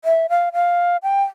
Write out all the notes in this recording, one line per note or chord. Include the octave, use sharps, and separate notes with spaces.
E5
F5
F5
G5